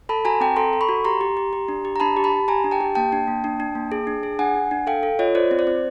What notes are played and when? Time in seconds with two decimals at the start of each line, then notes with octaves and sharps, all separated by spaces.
0.09 A4 A5 B5
0.25 F#4 G#5 A#5
0.40 C4 G5 A5
0.56 A4 A#5 C6
0.73 A4
0.81 B5 C#6
0.89 F#4
1.04 G4 A#5 C6
1.21 G4
1.37 G4
1.53 G4
1.68 D4
1.85 G4
1.96 A#5
2.00 D4 A5 B5
2.17 G4
2.24 A5 B5
2.32 G4
2.48 G4 G#5 A#5
2.64 D4
2.71 G5 A5
2.81 G4
2.95 A#3 G5 A5
3.12 D4
3.28 A#3
3.44 D4
3.60 D4
3.75 A#3
3.92 G#4
4.07 D4
4.23 G#4
4.39 D4 F#5 G#5
4.55 D4
4.71 D4
4.87 A4 F5 G5
5.03 A4
5.19 F4 C#5 D#5
5.35 F4 C5 D5
5.51 C4
5.59 C5 D5
5.67 C4